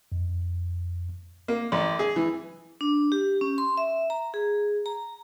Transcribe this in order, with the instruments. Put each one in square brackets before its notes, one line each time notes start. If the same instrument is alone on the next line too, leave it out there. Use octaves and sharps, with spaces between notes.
[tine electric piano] F2
[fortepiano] A#3
A1
G#4
E3
[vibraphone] D4
G4
C#4
C6
E5
A#5
G#4
A#5